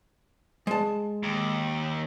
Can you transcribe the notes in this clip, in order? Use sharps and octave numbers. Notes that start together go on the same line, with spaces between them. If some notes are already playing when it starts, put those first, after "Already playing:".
G#3 A5
D#2